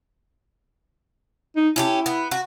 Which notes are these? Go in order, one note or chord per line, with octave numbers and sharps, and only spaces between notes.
D#4
C#4 D#4 E4 G4
B3
F#4